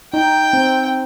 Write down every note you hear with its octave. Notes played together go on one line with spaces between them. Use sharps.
D#4 G5
C4